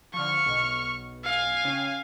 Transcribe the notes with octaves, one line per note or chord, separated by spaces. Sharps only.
D3 F3 C#6 F6
B1 B2
F5 G#5
C#3 C#4 G5